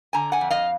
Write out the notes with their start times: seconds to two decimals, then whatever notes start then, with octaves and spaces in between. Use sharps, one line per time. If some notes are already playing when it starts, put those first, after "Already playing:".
0.13 D3 G#5 A#5
0.32 F#5 G#5
0.41 F2
0.50 D#5 F5